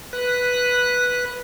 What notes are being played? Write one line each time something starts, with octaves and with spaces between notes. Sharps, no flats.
B4 F#6